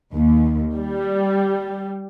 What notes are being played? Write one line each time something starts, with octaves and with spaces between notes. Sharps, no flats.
D#2
G3